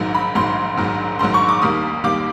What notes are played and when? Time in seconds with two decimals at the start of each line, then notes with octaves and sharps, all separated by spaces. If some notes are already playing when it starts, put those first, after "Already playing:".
Already playing: A#1 G#2 D#3 F#3
0.14 B5
0.35 A#1 G#2 D#3 F#3 C6
0.77 A#1 G#2 D#3 F#3
1.19 A#1 G#2 D#3 F#3 C6
1.34 C#6
1.49 D6
1.62 D#2 D#3 G3 A#3 D#6
2.04 D#2 D#3 G3 A#3 D6